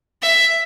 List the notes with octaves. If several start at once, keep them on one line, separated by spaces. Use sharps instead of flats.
E5